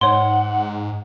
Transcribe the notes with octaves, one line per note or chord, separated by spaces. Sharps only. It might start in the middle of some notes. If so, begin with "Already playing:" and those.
G#2 C#5 F#5 C6